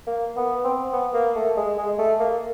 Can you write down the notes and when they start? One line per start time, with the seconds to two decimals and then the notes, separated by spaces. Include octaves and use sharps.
0.07 A#3
0.36 B3
0.64 C4
0.93 B3
1.14 A#3
1.35 A3
1.57 G#3
1.78 G#3
1.98 A3
2.20 A#3